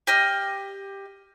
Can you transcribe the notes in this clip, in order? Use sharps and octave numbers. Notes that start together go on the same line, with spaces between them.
G4 D#5 F6